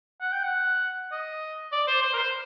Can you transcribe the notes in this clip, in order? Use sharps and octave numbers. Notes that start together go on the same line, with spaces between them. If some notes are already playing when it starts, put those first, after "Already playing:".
F#5
G5
F#5
D#5
D5
C5
C5
A#4
C5